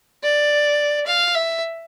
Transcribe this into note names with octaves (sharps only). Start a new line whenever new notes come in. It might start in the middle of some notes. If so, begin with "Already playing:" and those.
D5
F5
E5